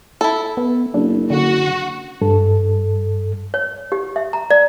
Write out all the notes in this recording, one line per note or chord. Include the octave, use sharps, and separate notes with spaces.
E4 A4
B3
F#1 D4
D3 F#4
G2 A4
C#5
G4
E5
A#5
D5